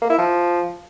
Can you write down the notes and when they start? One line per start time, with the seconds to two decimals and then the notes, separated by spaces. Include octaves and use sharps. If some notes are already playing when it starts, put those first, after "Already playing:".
0.02 A#3
0.10 E4
0.18 F3